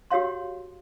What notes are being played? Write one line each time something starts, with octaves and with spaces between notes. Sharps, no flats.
F#4 G4 C#5 F5 C6